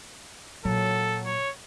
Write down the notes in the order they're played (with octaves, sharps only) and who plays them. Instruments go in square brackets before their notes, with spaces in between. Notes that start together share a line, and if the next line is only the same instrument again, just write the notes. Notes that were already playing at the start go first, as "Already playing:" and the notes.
[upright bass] A#2 [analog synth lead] F#3 [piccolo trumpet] A4
[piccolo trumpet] C#5